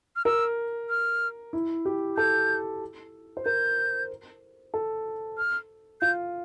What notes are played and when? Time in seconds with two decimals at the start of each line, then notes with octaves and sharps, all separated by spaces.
0.16 F6
0.25 A#4 E6
0.89 F6
1.53 E4
1.85 G4
2.17 A4 G6
3.37 C5
3.46 A#4 G6
4.74 A4
5.38 F6
6.01 F4 G6